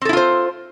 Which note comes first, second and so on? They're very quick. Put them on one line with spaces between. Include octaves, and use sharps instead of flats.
C4 A4 E4 F4 C5